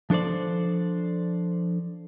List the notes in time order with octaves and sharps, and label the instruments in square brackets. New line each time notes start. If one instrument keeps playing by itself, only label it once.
[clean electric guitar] F3 D4 A4 C5 D5